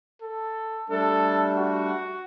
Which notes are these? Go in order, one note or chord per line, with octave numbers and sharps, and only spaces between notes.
A4
G3 A3 D4 A4
F#4